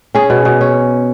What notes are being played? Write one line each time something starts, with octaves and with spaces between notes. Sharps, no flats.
C#4 G#4
B2
B2
C#4